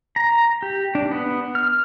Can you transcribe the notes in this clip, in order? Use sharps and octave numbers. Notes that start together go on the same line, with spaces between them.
A#5
G4
D4
B3
F6